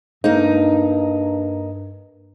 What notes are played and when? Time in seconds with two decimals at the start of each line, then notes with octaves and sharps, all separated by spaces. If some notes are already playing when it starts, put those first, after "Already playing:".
0.24 G2 A#3 D#4